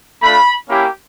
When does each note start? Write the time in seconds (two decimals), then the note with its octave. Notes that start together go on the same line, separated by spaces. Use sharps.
0.22 A3 D4 F4 B5
0.69 A#3 C#4 E4 G4